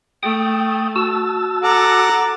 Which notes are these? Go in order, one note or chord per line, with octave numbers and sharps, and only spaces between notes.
A3 G5 D#6
F#4 A5 E6
A4 F#5 A#5 D6